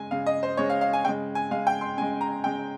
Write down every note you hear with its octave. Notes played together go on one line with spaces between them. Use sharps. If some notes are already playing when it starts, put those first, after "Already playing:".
Already playing: C#3 G#3 G#5
C#3 G#3 F5
D#5
C5
C#3 G#3 C#5
F5
F5
G#5
C#3 G#3 G5
G#5
C#3 G#3 F5
G5
C6
C#3 G#3 G#5
A#5
C#3 G#3 G5